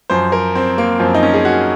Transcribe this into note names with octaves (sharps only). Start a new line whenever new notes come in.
F#2 F3 C5
A#4
C4
A#3
F#2 F3 C4
D#4
C#4
G#4
F#4